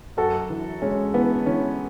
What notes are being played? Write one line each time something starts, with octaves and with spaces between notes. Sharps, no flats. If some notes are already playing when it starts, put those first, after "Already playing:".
F#2 F#4 A4
E3
G#3 C#4
E3 B3
E3 C#4